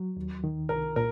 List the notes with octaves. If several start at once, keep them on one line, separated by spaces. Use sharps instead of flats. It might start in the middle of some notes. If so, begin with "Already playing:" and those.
Already playing: F#3
D#2
D#3
C2 A#4
A#2 A#4